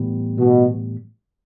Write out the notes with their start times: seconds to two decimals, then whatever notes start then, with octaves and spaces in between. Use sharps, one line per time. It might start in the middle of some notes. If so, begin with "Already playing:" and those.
Already playing: A2 E3 G3 B3
0.39 B2